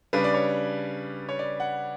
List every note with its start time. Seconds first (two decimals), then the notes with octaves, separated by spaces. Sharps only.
0.13 C#3 G3 D4 B4
0.24 D5
0.34 C#5
1.29 C#5
1.39 D5
1.60 F#5